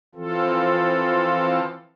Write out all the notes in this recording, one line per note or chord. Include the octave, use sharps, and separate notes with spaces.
E3 F3 C4 F4 A4